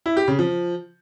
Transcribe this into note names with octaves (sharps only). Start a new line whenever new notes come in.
E4
G4
C#3
F3